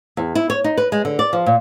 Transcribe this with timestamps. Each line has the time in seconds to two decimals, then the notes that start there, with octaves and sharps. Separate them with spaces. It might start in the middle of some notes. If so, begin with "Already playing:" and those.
0.17 E2
0.35 E4
0.50 C#5
0.64 D#4
0.77 B4
0.92 G#3
1.05 D3
1.19 D5
1.33 F3
1.46 A#2